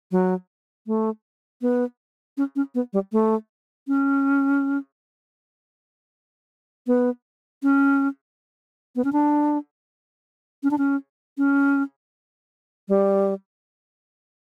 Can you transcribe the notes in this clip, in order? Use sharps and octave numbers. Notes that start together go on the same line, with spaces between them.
F#3
A3
B3
C#4
C#4
B3
G3
A3
C#4
B3
C#4
B3
C#4
D4
C#4
D4
C#4
C#4
G3